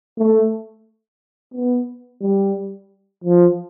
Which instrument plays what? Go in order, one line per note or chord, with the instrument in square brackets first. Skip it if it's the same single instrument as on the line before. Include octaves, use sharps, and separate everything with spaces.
[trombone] A3
B3
G3
F3